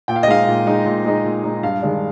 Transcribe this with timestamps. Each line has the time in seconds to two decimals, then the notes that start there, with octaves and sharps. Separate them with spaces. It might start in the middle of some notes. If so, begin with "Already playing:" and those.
0.08 A#2 G5
0.16 F5
0.23 D#5
0.27 G#3 D#4 F5
0.47 A#2
0.66 G#3 D#4
0.86 A#2
1.05 G#3 D#4
1.25 A#2
1.43 G#3 D#4
1.63 G2 F5
1.82 D#3 G#3 D4